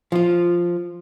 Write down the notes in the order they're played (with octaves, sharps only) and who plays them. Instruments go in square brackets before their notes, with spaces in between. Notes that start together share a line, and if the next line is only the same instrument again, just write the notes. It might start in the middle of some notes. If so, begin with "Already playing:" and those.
[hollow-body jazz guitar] F3 F4